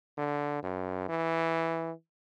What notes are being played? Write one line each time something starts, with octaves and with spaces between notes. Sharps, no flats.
D3
F#2
E3